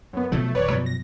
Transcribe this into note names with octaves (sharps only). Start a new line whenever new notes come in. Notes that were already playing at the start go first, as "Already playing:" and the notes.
F#2 B3
B2 F3 F#3 A3
D1 B4 C#5 D5
F#2 B2 F3
A#6